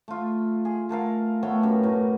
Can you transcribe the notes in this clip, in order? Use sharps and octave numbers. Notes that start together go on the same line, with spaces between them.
A3 F4
G#4
A3 A4 A#4 F5
A3 B3 C#5 G5
F#2 G4
A2 C#4 A#5